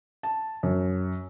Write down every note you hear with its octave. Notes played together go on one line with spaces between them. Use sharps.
A5
F#2